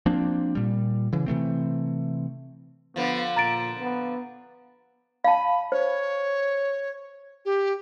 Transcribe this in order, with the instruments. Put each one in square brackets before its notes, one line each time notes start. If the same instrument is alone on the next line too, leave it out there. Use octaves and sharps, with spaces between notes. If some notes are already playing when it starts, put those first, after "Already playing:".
[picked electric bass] F3 A#3 C4 D4
A#2 G3
C#3 E3
C3 E3 A3 C4
[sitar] D3 F3 [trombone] B3
[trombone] A#2 [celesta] A#5 A6 D7
[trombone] B3
[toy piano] F5 A5 [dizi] B5
[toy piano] C5 [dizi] C#5
[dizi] G4